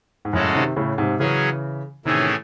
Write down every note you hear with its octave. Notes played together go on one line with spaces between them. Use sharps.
G#2
F#2 A2 C#3 G#3 C#4 F#4 A4
C3 D#3
A2 C#3
G#2 C3
C#3 E3 F#3 C#4 G#4
A2 C3 D#3 E3 A3 C#4 G#4